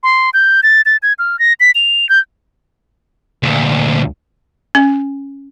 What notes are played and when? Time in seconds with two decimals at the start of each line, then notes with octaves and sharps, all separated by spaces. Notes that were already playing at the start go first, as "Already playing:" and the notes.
0.03 C6
0.34 G6
0.63 A6
0.86 A6
1.03 G#6
1.19 F6
1.39 A#6
1.60 B6
1.75 F7
2.09 G6
3.43 D2 A#2
4.75 C#4